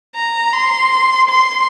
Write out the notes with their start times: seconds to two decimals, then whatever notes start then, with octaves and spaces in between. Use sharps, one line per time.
0.15 A#5
0.53 C6
1.29 C6